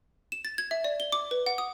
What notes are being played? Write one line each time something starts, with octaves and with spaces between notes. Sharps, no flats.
E7
A6
G#6
E5
D5
G7
D6
B4
F#5
D#6